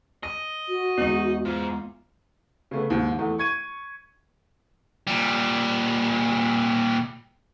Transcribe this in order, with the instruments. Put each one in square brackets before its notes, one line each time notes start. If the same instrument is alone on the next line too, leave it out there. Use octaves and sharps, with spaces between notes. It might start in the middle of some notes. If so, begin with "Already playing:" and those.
[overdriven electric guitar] D#5 [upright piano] A#6
[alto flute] F#4
[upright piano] E2 G#3 F#7 [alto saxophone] D#4
[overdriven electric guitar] G#2 [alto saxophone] F4
[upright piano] C#3 A3 B3
D#2 G#2
E2 A3
C#6 G#6 D#7
[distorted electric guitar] A#2 G3